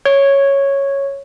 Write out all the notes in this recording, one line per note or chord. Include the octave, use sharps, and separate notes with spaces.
C#5